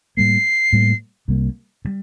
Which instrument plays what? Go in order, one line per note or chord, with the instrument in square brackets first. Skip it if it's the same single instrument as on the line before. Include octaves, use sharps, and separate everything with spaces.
[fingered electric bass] A2 G3 A#3 [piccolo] C7
[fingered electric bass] A2 G3 A#3
C2 C3 G3 A#3
C3 G3